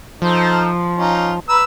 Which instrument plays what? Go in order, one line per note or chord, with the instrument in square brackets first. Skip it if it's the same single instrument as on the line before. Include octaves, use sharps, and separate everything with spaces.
[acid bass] F3 [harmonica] D#4 A4 C5
[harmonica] C#4 D#4 F4
B4 A#5 E6